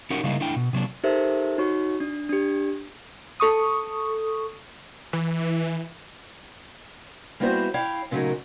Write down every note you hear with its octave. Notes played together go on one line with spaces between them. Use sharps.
C#4 D#4 F#4 G4 A#4
C#3 G3 G#3 A#3 D#4 E4
A3 D4 E4 G5
B2
C3 F#3 A#3 D4
D#4 G4 A4 A#4 C5 E5
D#4 F#4 C#5 C#6
D4
D4 G4
A4 C#6 D#6
E3
G3 A#3 B3 E4 F#4 C5
E4 C#5 F5 G5
A#2 C#3 F#3 A3 D#4 A#4